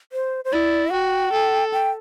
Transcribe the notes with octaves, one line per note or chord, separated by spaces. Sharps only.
C5
C5
E4 D5
F#4 G5
A4
G5